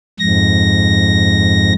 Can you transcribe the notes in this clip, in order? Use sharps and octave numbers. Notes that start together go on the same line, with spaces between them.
F2 G#2 A#6